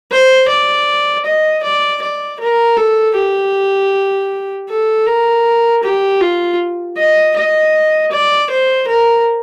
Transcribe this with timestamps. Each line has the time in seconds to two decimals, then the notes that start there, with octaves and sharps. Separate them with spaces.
0.11 C5
0.48 D5
1.25 D#5
1.63 D5
2.02 D5
2.40 A#4
2.77 A4
3.16 G4
4.69 A4
5.06 A#4
5.83 G4
6.21 F4
6.97 D#5
7.36 D#5
8.12 D5
8.50 C5
8.88 A#4